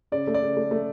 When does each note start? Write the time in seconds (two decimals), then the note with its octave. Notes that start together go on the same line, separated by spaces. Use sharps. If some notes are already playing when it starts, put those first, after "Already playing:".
0.12 C#3 D5
0.27 A3
0.34 D5
0.42 C#3
0.57 A3
0.71 A3